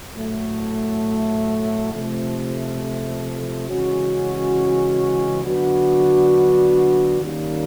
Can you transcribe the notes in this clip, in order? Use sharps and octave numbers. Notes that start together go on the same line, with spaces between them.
A2 F#3 A3
C3 F3 A3
C#3 E3 G#3 C#4 F#4
D3 F#3 B3 D4 F#4
D#3 G3 A#3 C#4